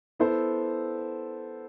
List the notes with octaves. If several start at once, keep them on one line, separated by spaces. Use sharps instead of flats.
B3 E4 A4 C5